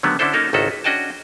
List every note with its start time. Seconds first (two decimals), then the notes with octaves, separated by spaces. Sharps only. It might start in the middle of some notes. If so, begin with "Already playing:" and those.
0.03 D3 D#3 F#3 G#3 A3 B3
0.19 D3 C#4 D4 E4 A4 C5
0.33 A#3 C#4 D#4 F#4 A4 A#4
0.53 G#1 C#2 D#3 E4 F#4 A4
0.71 B4
0.84 C#4 D4 F#4 D#5 G5 A5